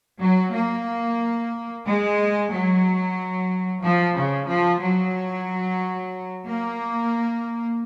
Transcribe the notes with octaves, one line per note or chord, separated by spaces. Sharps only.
F#3
A#3
G#3
F#3
F3
C#3
F3
F#3
A#3